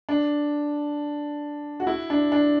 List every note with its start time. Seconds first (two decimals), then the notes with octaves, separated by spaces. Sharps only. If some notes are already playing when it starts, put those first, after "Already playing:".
0.09 D4
1.80 F#4
1.87 E4
2.10 D4
2.32 D4